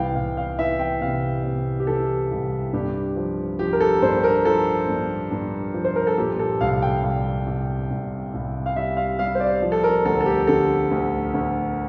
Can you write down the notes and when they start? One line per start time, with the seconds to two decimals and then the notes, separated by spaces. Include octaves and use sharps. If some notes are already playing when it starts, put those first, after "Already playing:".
Already playing: C2 E3 F5 G5
0.15 C2 F5
0.37 F5
0.59 E3 E5
0.79 G5
1.01 C3 F5
1.44 C3
1.80 G4
1.87 E3 A4
2.31 C2
2.73 G2 G4
3.16 F3
3.59 F3 G4
3.73 A#4
3.80 A4
4.02 G2 C5
4.24 A#4
4.45 F3 A4
4.88 G2
5.31 G2
5.74 F3
5.84 C5
5.96 A#4
6.07 A4
6.18 A#2 G4
6.39 A4
6.60 C2 F5
6.82 G5
7.03 C2 F5
7.46 C2
7.90 C2
8.33 C2
8.66 F5
8.76 G3 E5
8.97 F5
9.19 G3 F5
9.35 C5
9.40 D5
9.62 F3
9.72 A4
9.84 A#4
10.05 D2 A4
10.21 A4
10.26 G4
10.47 D3 A4
10.91 D2
11.34 D2